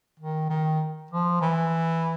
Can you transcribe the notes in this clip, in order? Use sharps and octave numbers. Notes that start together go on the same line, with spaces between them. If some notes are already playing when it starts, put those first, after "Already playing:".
D#3
D#3
F3
E3